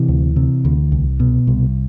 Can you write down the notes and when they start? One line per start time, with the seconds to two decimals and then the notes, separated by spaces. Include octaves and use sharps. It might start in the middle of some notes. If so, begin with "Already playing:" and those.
Already playing: C3 E3
0.08 D2
0.36 C3
0.65 D2
0.92 C2
1.20 B2
1.47 C2